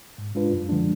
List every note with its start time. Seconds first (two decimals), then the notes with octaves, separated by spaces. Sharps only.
0.18 G#2
0.35 G#3 D4 F4 B4
0.53 F#2
0.69 D3 F3 G#3 D4